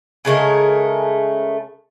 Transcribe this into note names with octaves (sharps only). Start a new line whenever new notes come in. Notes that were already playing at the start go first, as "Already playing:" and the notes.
C#3 G#3 A3 A#4